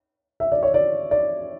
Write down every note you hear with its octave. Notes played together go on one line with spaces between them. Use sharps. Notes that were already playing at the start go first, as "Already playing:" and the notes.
E5
D5
C#5
D5
D5